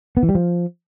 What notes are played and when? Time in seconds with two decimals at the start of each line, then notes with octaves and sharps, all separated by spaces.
0.17 B3
0.23 E3
0.29 G3
0.35 F3